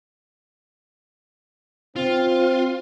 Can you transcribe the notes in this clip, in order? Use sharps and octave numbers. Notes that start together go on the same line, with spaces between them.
C4 F4